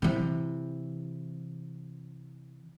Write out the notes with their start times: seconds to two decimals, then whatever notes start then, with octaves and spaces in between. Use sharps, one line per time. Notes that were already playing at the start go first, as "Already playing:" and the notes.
0.02 C3 E3